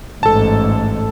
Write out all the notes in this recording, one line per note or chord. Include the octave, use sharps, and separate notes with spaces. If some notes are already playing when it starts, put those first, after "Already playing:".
A1 G#2 A4 A5